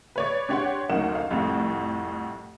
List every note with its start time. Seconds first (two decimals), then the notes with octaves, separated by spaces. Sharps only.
0.16 B4 C#5 D5
0.49 D4 G4 C#5 F#5 C6
0.89 F#1 D2 D#4 A#4 F#5 E7
1.15 F5
1.30 C2 F2 A2